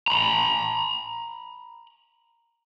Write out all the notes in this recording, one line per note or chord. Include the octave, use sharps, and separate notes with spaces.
A#5 B5